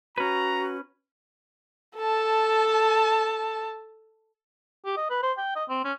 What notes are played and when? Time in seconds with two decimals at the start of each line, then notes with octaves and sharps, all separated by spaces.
0.18 C#4 F#4 B4 A#5
1.97 A4 A5
4.85 G4
4.97 D#5
5.10 B4
5.23 C5
5.38 G5
5.56 D#5
5.69 C4
5.85 C#4